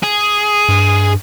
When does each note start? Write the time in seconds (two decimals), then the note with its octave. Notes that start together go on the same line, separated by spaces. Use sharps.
0.03 G#4
0.69 G2